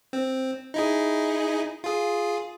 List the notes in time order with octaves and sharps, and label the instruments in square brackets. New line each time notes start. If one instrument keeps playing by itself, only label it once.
[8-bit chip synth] C4
D#4 E4 G#4
F4 G#4